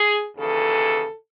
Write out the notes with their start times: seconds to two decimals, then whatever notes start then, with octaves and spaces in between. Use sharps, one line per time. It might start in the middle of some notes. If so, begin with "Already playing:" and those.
Already playing: G#4
0.36 D#2 C#3 E3 A4